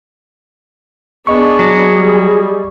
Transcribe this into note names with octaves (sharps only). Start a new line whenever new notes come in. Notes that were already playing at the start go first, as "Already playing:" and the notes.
B3 D4 G#4 D#5 C#6
F#3
G3